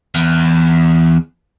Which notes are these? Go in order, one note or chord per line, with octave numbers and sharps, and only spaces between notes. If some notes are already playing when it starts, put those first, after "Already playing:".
E2